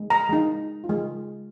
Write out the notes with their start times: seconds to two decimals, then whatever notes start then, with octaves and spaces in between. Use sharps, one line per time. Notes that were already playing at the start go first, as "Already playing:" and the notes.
Already playing: G#3
0.10 A#5
0.29 G#3 D#4
0.84 F4
0.89 G#3